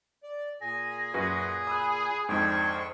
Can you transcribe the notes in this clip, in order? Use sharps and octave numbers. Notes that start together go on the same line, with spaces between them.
D5
A#2 G#4 G#5 A#6
F#2 F#4 G#4 B4
B5 D#6 E6 F#6
F2 G#2 D4 C5 G5 C#6 G#6